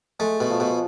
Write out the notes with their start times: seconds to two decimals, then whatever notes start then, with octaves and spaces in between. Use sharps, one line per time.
0.19 G#3 A3
0.40 B2
0.50 F3
0.60 B2